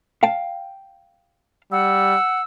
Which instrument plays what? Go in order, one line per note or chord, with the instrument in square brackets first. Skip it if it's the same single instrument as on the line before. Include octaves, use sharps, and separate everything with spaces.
[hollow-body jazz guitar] F5 G5 A5
[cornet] G3 [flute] F#5 [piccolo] E6